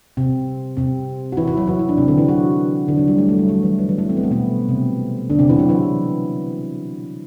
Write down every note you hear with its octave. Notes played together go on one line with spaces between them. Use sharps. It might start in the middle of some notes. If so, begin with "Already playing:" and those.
C3 C4
C3 C4
F#4
E3 E4
E3 E4
F#3 F#4
E3 E4
E4
D4
C3 C4
D3 D4
E3 E4
F#3 F#4
D3 D4
F#3
G3
A3
A3
G3
F#3
E3
E3
E3
A3
C4
B3
A3
B2 B3
C3 C4
D3 D4
C3 C4
E3 E4
F#3 F#4
E3 E4